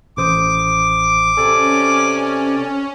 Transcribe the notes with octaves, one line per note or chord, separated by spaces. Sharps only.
A1 C5 D6 D#6
C3 C#4 A4 D5 G#5